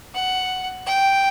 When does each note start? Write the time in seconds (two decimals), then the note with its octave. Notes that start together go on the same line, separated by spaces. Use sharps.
0.15 F#5
0.86 G5